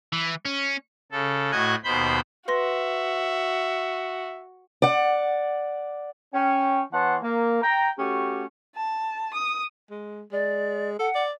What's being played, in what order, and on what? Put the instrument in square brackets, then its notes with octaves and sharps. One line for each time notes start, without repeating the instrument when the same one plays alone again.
[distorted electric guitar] E3
C#4
[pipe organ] C#3 A4
A2 F#4 D#5 G#5 F#6 G#6
D#2 B2 C5 B5 G6
[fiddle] F#4 [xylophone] B4 C6 A#6 [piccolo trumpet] E5
[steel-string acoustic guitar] D5 F#5
[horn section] C#4 G5
E3 B3 C#5 F#5 A5 C6
A#3
G5 A#5
A3 C#4 F#4 G4
[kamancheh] A5
D#6
[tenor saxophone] G#3
[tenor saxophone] G#3 [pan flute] D5
[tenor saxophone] A4 [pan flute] F#5
[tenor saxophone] D5